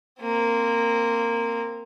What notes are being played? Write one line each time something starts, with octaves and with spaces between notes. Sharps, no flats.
A#3 C4